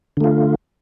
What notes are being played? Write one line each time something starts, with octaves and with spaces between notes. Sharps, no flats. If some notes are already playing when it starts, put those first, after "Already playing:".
D3 A3 F4